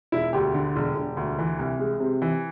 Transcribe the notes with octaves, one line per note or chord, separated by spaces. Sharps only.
E1 E4
D2 G4
D3
E1
E1
D2
E3
C2
G#3
C3
E3